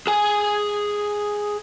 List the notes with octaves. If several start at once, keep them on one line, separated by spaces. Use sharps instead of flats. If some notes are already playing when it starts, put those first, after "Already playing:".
G#4 G#5